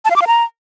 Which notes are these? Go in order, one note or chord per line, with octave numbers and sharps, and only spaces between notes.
A5
F5
D6
F5
A#5